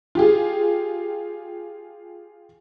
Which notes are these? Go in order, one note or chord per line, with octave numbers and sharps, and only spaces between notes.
F4 G4 G#4